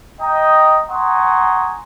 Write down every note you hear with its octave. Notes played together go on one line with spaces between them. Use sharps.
D#5 G5 A#5
F#5 G#5 A#5 C6 C#6 D#6